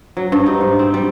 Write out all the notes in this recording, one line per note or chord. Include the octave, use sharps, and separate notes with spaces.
F#3
G2
D#4
G#2
C4
G3